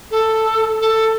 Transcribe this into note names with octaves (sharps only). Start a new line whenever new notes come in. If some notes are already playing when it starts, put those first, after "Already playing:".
A4
A4